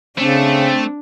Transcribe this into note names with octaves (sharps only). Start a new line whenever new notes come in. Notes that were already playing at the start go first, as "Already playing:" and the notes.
C#3 A3 C4 D4